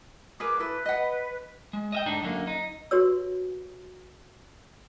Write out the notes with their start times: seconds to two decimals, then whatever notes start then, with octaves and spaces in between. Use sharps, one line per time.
0.40 G#4 A#4 B4 D6
0.59 E4 A4 B4
0.86 D#5 F#5
1.73 G#3
1.92 D#5 E5 G5
2.06 G#2 D3 D4 D#4
2.23 F#2 D3 A#3
2.47 D#4
2.91 F#4 G4 B4 C#5 E6